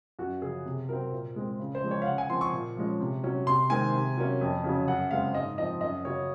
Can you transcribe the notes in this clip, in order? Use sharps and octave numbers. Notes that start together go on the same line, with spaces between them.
F#2 F#4
C#3 F3 G#4
C3
F#3 C4 A#4
A#2
G#3 C4
C#3
C5
F3 G#3
C#5
F5
C#3 F#5
G#5
F3 C4 C6
C#6
A#2
F3 G#3 C#4
C3
F#3 C#4
C3 C6
D#3 G#3 C4 G#5
C3
F#3 A#3 C#4
F2
C#3 F#3 C#4
F#2 F#5
C#3 G#3 C4 F5
G#2 D#5
F3 C4 D#5
F#2 D#5
C#3 F#3 C#4 C#5